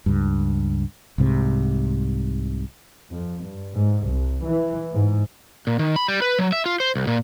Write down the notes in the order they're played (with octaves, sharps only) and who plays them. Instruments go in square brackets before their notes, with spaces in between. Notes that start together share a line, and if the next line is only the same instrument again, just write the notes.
[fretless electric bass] C#2 G2
C2 G#2 C3
[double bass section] F2
G2
G#2
C2
E3
G#2
[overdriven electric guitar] A#2
D#3
B5
G3
B4
F#3
E5
F4
C5
C2
A#2